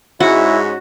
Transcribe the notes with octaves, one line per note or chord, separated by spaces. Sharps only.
G#2 G#3 C#4 E4 F#4